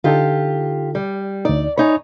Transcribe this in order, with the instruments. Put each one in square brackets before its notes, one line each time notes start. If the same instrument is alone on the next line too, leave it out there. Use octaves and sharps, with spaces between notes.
[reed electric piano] D3 D#4 A4 [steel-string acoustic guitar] F4 G4
[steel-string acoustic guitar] G3
[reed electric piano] D2 D#4 [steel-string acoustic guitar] D5
[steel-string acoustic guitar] D#4 C#5 [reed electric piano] G#5 B5